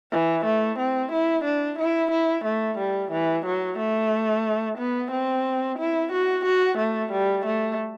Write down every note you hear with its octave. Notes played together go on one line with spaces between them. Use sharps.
E3
A3
C4
E4
D4
E4
E4
A3
G3
E3
F#3
A3
B3
C4
E4
F#4
F#4
A3
G3
A3